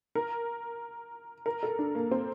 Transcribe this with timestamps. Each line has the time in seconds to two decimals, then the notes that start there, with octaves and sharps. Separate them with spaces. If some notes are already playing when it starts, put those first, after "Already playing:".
0.15 A#4
1.46 A#4
1.63 A4
1.79 D4
1.95 A#3
2.11 C4